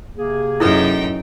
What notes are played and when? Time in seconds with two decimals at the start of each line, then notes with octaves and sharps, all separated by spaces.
0.17 C3 A#3 G#4
0.60 F#2 D#4 E4 A4 B4 G5